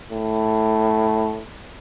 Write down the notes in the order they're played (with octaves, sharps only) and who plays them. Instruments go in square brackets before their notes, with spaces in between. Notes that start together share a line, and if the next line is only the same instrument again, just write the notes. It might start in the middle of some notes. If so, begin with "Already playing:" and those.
[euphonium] A2